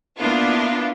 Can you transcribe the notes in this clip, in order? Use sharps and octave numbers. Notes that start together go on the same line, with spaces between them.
A#3 B3 D4 E4 F4